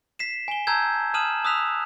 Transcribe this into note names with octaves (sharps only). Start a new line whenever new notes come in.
B6 C7 E7
G#5 G7
A5 A#5 E6 G6 G#6
A5 D#6 F6 D#7 E7 F#7
D#6 E6 F#6 B6 F7